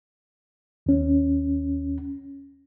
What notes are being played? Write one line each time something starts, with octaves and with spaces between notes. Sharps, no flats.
D#2 C#4